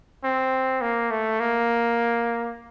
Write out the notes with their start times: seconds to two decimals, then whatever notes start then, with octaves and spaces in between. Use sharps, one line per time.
0.24 C4
0.81 A#3
1.11 A3
1.40 A#3